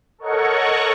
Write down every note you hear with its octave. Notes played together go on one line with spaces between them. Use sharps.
A4 A#4 C#5 D#5 F#5 C#6